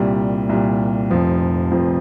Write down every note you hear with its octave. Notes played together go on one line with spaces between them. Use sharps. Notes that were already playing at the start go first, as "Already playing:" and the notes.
Already playing: C2 A#2 G3
C2 A#2 G3
F1 F2 F3
F1 F2 F3